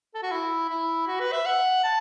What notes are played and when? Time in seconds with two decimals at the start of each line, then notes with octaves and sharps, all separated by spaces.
0.15 A4
0.23 F#4
0.32 E4
0.69 E4
1.07 F#4
1.20 B4
1.33 E5
1.46 F#5
1.84 A5